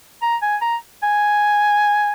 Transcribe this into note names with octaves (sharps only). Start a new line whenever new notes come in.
A#5
G#5
A#5
G#5